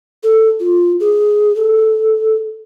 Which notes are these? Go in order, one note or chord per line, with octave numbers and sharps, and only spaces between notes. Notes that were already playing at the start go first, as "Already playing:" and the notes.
A4
F4
G#4
A4